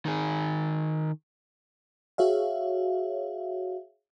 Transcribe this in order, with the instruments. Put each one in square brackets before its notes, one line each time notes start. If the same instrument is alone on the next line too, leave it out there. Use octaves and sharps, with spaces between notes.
[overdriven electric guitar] D#3 G#4
[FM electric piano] F#4 G#4 C#5 E5 F5